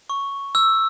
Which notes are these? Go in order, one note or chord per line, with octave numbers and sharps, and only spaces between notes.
C#6
E6